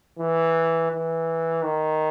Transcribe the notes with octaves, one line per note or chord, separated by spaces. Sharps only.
E3
E3
D#3